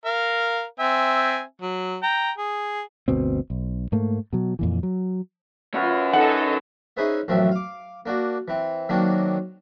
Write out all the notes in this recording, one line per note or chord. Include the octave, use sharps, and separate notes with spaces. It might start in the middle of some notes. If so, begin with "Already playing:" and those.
A#4 F5
C4 E5 G#5
F#3
G5 A#5
G#4
G1 D2 B2 C4
B1
G#2 A3 A#3
B2 F#3
F2 A#2 E3
F#3
C#4 F4 F#4 B4 E5
D#4 A4 F#5
C#4 D#4 G#4 B4 C5 E5
A1 F#2 F3 C4 E5
F5 D6
A#3 D4 F#4
E3 C4
D#3 F#3 A#3 C4 D4 D#4